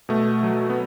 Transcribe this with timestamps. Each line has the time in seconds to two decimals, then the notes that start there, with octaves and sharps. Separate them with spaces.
0.09 B2 A3
0.43 F#3
0.70 B3